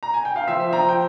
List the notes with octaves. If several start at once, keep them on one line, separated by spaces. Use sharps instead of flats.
A#5
G#5
G5
F5
F3 C5 E5
F3 G5 A#5
G5